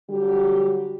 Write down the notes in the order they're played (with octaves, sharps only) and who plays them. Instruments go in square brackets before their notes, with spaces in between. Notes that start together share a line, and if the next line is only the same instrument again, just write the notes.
[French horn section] D3 F#3 G3 F#4 G4